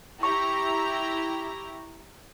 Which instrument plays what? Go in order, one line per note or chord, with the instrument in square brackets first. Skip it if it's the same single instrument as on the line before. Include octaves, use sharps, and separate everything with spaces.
[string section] E4 G4 A#5 [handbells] C#6